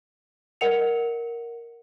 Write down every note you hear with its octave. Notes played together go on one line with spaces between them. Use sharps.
A#4 D#5 F#5 C#7 F7